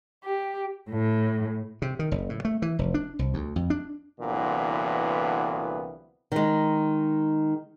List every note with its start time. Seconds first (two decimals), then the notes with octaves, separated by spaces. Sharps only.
0.24 G4
0.90 A2
1.82 C3
1.99 D#3
2.12 F#1
2.29 A2
2.45 A3
2.62 E3
2.79 F1
2.94 D4
3.19 C2
3.34 D2
3.56 F2
3.70 D4
4.20 C2 A#2 D3 E3 F#3 B3
6.32 D#3 G#3